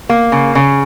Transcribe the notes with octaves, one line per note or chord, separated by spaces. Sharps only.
A#3
C#3
C#3